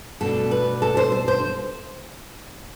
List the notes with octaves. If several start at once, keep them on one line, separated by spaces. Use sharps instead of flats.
B2 A3 D4 A4
B4
A4
C5
C5
C5